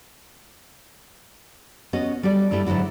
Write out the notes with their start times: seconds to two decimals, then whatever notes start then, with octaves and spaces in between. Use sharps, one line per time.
1.93 B3 C#4 F#4 D#5
2.23 G3 F#4 A4 D5
2.51 G2 G3 A3 E4 E5
2.67 G#2 D3 F#3 E4 F#4